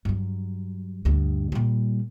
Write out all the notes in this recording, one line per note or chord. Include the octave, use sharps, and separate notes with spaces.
G2 F#3
D2 G2
A#2 G3